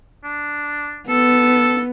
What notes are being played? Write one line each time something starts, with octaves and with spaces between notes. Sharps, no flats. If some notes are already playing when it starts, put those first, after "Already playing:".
D4
B3 A4